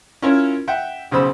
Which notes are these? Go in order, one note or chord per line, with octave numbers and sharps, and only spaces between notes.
C#4 E4 F4 A#4 C#5
E5 F#5 G5
B1 C#3 C5 B5 E6